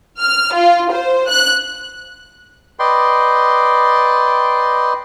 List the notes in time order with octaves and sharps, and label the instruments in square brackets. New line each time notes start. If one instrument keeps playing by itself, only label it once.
[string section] F6
F4
C5
F#6
[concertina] B4 D5 D#5 G5 C6